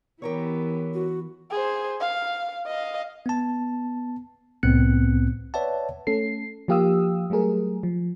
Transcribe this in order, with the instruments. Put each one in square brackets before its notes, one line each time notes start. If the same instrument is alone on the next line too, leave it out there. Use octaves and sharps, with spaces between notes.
[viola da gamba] E3 B3 [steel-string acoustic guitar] G4 A#4 C#5
[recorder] F#4
[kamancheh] G#4 C5
F5
D#5 F5
[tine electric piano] B3 A5
C2 A2 B3 C4 F#6 C#7
B4 C#5 D5 E5 F#5 A5
[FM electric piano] A3 C#4 A4 C7
F3 A#3 G4 F5 D#6 E6
F#3 G3 A3 G#4 A#4
F3